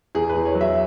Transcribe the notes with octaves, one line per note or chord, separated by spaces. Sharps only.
E2 G#4
B4
E2
C#5
F#3
E5